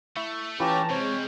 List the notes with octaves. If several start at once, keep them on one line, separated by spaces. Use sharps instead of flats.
A3 E4 E5 C#6
E3 C#4 F4 G4 B4 C#5 A5 A#5
C3 G3 G#3 C4 C#5